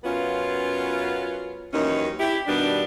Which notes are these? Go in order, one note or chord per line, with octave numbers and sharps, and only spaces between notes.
F#2 B3 C#4 F4
D#2 D#3 E3 F#3 C#4 D#4
E4 G4
B2 D#3 G3 B3 D4